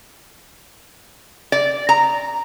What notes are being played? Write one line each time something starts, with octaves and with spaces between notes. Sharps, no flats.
D5
A#5